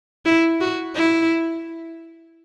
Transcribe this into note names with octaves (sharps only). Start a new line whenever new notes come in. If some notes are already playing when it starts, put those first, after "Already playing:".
E4
F#4
E4